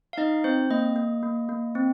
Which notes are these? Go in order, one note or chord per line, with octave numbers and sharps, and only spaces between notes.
F5
D#4 D#5
C4 C5
A#3 D#5
A#3
A#3
A#3
C4